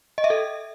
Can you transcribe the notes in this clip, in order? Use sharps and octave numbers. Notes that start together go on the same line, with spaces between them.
D#5
E5
A4